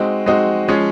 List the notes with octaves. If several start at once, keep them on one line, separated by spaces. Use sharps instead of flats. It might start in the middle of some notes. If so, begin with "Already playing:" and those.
Already playing: G#3 C4 D#4 F#4
G#3 C4 D#4 F#4
F3 G#3 C#4 G#4